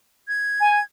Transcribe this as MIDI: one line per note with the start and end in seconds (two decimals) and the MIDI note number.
0.28 0.83 92
0.61 0.80 80